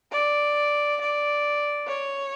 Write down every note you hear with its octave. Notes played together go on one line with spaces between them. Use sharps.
D5
D5
C#5